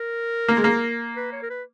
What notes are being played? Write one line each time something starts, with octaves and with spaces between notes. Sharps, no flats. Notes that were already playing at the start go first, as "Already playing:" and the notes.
Already playing: A#4
A#3
G#3
A#3
B4
C#5
A#4
B4